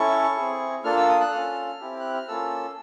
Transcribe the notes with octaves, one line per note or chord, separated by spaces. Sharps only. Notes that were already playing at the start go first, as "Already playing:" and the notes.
Already playing: C#4 E4 A4 C#6
C4 E4 G#4
A#3 D4 F4 A4 F6
E6
D#6
F#6
C#4 F4 A4 F6
C4 E4 G4
F#6
F6
A#3 C#4 F4 A4 E6